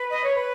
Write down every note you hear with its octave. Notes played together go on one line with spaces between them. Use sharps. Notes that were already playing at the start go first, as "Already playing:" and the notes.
Already playing: B4
D#5
C#5
B4